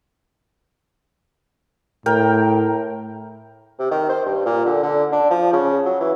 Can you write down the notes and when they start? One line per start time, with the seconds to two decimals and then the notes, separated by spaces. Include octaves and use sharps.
2.06 A2 A#4 G5
3.79 C3
3.91 D#3
4.09 C5
4.26 G2
4.46 A#2
4.66 D3
4.83 D3
5.12 D4
5.31 F3
5.53 C#3
5.85 F#3
6.00 E3